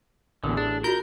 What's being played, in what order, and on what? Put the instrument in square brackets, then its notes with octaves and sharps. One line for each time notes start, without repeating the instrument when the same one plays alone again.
[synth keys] A1 [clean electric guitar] E2 D3 [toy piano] A#4
[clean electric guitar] D4 [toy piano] G#4
[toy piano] F4 F#4 [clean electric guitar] A#4 [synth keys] G6